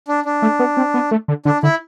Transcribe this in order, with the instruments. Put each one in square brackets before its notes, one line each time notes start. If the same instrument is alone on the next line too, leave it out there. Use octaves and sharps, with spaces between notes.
[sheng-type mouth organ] D4
D4
[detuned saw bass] A3
B3
C4
B3
A3
D3
[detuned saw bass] D3 [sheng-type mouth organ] D4
[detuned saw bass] D3 [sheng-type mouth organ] E4